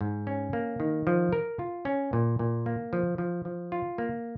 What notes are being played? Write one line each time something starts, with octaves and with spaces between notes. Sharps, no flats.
G#2
C#4
A#3
D#3
F3
A#4
F4
C#4
A#2
A#2
A#3
F3
F3
F3
F4
A#3